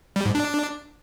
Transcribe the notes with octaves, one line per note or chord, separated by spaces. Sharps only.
G3
G#2
D4